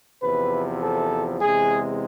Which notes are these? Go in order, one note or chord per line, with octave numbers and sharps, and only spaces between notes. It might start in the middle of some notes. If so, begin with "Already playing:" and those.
E2 C3 F3 B4
A4
E2 C3 G#3 G#4